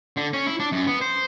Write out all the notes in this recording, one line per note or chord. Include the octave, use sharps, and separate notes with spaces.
D3
C#4
E4
D4
F#2
B3
C5